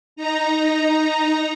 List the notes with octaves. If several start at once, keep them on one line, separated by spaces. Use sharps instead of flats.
D#4 A#5